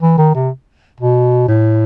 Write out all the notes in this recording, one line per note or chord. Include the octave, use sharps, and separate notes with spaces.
E3
D#3
C3
B2
A2